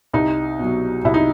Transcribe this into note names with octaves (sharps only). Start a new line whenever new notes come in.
C2 D#4
B2 F#3
C2 E4
D#4